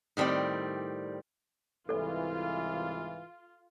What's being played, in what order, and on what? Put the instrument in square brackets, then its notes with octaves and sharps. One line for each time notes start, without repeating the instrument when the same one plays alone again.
[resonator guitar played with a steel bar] A2 D#3 G3 C4 D5
[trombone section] C2 G#2 E3 [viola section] F4 [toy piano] A4 D5